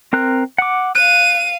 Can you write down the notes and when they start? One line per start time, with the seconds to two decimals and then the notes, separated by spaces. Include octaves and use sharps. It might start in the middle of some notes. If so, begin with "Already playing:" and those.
0.13 C4 A#4 F#6
0.58 F#5 D6
0.95 F5 F#6 D#7